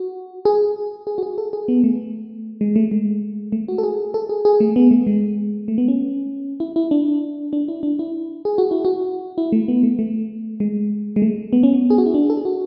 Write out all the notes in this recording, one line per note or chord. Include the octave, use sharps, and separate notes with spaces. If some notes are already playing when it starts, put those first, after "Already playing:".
Already playing: F#4
G#4
G#4
F#4
G#4
A4
G#4
B3
A3
G#3
A3
G#3
A3
F#4
A4
G#4
A4
G#4
G#4
A3
B3
A3
G#3
A3
B3
C#4
E4
E4
D4
D4
E4
D4
E4
G#4
F#4
E4
F#4
E4
A3
B3
A3
A3
G#3
G#3
A3
B3
C#4
B3
G#4
F#4
E4
D4
A4
G#4
F#4